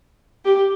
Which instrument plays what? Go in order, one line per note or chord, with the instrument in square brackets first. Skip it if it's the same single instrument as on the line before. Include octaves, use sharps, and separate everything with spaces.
[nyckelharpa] G4